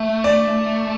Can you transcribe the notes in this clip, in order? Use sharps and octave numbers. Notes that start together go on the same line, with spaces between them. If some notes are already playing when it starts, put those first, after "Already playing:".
Already playing: A3 E5
D5